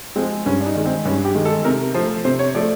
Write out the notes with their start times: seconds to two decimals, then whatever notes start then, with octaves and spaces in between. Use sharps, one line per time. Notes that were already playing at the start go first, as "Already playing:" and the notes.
0.16 F3 G#3 C4
0.46 G2 C#4
0.61 D4
0.66 D#4
0.75 D#3 G#3
0.86 C4
1.05 G2 C#4
1.25 G4
1.35 D#3 G#3
1.45 A4
1.65 C3 A#4
1.94 F3 A3 C5
2.24 C3 C5
2.39 C#5
2.55 F3 A3 D5